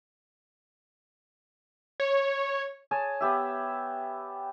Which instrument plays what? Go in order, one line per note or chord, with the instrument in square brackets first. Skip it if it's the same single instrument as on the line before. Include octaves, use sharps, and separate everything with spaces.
[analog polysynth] C#5
[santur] G#4 C#5 G#5 A5
B3 G4 E5